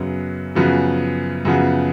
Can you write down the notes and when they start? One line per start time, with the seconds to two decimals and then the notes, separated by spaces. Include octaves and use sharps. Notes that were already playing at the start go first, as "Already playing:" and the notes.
Already playing: F#2 C#3 F#3 B3
0.55 F#2 C#3 F3 B3 F#4
1.45 F#2 C#3 F3 B3 F#4